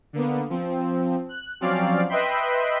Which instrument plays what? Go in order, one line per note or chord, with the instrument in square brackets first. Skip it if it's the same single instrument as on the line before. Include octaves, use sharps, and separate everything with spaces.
[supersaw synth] D3 A#3 B3
F3 C4
F#6
F3 F#3 C4 C#4 D5 F5
B4 D#5 E5 G5 B5 C6